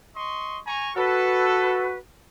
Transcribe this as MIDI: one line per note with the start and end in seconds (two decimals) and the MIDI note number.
0.16 0.59 75
0.16 0.59 84
0.16 0.59 85
0.67 0.91 80
0.67 0.91 82
0.67 0.91 85
0.96 1.97 66
0.96 1.91 69
0.96 1.97 71